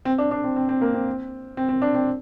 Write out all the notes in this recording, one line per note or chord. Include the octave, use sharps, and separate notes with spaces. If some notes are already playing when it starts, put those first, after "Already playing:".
C4
D4
D4
C4
C4
C4
A#3
C4
C4
C4
D4
C4